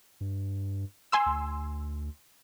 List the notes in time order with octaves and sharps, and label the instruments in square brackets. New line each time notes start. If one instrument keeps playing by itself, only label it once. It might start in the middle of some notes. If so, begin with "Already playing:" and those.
[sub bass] G2
[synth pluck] G#5 C6 E6
[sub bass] D2